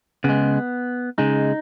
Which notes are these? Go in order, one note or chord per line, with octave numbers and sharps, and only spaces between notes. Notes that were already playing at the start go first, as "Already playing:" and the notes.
C#3 G#3 B3
C#3 G#3 D#4